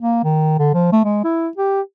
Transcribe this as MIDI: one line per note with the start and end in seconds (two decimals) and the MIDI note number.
0.01 0.19 58
0.24 0.54 51
0.59 0.73 50
0.74 0.90 53
0.92 1.00 57
1.04 1.22 56
1.24 1.48 64
1.57 1.81 67